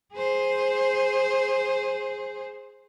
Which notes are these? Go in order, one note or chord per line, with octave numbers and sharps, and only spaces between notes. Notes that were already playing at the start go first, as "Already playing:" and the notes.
G#4 C5